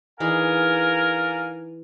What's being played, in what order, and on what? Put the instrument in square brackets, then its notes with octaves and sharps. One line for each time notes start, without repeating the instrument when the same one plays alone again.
[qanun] E3 D#4 G#4 [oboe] A#4 [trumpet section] D5 F5 G#5